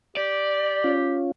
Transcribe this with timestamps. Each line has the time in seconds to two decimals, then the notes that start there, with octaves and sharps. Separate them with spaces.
0.17 G4 D5
0.84 C#4 F4